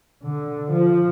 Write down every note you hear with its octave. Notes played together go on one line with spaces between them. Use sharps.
D3
F3